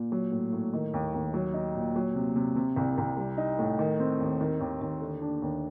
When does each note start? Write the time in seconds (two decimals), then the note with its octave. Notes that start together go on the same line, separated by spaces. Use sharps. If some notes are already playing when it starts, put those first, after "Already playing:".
Already playing: A#2
0.12 F#3
0.31 A2
0.53 A2
0.73 D#3
0.94 D#2
1.14 D#2
1.34 F#3
1.54 D#4
1.75 A#2
1.96 F#3
2.15 C3
2.36 C3
2.56 C3
2.76 C2
2.98 C2
3.17 G3
3.37 D#4
3.59 A2
3.79 D#3
3.99 C4
4.20 D#2
4.41 D#3
4.60 D#2
4.81 D#2
5.01 D3
5.22 D4
5.42 D#2